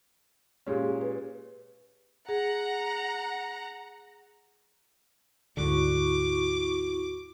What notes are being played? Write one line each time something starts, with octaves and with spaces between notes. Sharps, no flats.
A#2 G#3 C#4 G4 G#4
B4
G#4 F#5 A#5
D2 G#2 D3 E4 F#4 C#6 D6